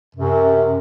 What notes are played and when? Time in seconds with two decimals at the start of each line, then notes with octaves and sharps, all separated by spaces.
0.16 F#2 C3